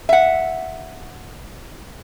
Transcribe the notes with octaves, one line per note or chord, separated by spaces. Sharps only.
E5 F#5